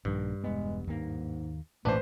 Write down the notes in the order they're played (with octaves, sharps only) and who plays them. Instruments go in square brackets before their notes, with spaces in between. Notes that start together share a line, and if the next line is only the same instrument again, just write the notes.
[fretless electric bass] A#1 D#3 D4 [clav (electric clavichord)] G2
[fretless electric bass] E1 B3 [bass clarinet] G#3
[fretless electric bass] D#2 A#3 [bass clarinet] G#2
[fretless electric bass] E1 A#2 [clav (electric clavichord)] A1 D4 [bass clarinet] A3 [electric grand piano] B4 C5